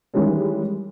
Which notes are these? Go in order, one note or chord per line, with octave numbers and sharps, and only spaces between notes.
D#3 E3 G3 G#3 C#4